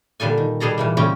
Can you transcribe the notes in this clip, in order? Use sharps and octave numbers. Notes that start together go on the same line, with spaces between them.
A#2 D3 G3 A4 G#5
D#3
B2 G3 G#4 A4 A#5
A#2 E3 G3
C#3 G3 A#3 C4 C#4 G5